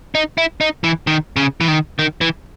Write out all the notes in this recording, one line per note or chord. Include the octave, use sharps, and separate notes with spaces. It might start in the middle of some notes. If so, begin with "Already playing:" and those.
D#4
E4
D#4
E3
D#3
C#3
E3
D#3
D#3
E3